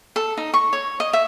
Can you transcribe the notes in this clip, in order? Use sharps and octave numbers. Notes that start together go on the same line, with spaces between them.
A4
D#4
C#6
C#5
D#5
E5